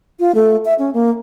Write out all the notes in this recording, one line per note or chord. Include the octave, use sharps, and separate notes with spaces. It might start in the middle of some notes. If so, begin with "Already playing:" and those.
F4
A3
E5
C#4
A#3